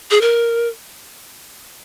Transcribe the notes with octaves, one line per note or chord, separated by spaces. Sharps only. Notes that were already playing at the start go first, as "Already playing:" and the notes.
G#4
A#4